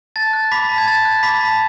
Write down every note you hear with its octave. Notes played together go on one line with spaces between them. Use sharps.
A5 A6
F#6
B5 D6 B6
A5
G#6
A5 A6
F#6
B5 D6 B6
A5